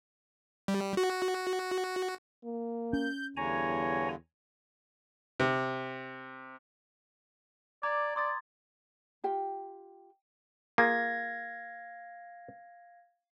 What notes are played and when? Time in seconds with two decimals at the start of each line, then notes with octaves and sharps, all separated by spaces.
0.68 G3
0.97 F#4
2.44 A#3
2.93 C#4 G6
3.37 E2 G2 D3 C#5 G#5 A#5
5.40 C3
7.83 D5 A#5 D6 G#6
8.16 D5 C6 D#6 A6
9.24 F4 G4 G5
10.78 A#3 F4 G#4 F5 G#6 A#6